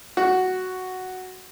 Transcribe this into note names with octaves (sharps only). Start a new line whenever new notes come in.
F#4